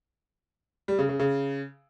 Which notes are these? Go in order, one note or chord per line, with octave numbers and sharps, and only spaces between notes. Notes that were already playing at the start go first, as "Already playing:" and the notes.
G3
C#3
C#3
C#3